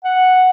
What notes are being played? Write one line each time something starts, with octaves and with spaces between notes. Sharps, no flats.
F#5